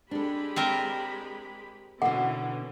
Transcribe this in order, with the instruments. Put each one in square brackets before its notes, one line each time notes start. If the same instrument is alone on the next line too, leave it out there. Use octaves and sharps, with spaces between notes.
[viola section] G#3 G4 B5 [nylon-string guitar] D4 A4
[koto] C4 F4 A#4
[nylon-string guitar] B2 D3 [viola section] E3 C#4 [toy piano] F#5